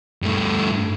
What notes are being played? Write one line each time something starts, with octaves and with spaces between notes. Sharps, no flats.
G2 A3